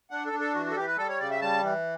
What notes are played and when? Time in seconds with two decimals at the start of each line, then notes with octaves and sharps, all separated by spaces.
0.11 D4 F#5
0.26 A4
0.33 D4
0.40 A4
0.55 E3 F#4
0.66 F#4
0.71 A4
0.76 E3 G4
0.87 B4
0.98 G3 A4
1.09 C#5
1.20 C#3 D5
1.30 E5
1.42 G3 A5
1.63 E3